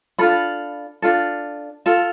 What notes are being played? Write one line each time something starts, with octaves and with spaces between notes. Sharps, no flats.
D4 F4 A4 B5
D4 F4 A4
F4 A4 A5